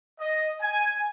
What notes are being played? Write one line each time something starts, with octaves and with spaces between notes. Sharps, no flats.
D#5
G#5